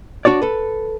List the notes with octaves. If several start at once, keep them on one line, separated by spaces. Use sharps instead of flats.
D4 F#4 C#5 D5
A4 B4